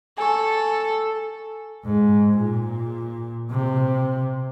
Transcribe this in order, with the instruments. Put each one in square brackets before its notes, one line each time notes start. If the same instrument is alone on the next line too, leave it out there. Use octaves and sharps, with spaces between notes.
[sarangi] A4 [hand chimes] G#5 C#6
[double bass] G#2
A#2
C3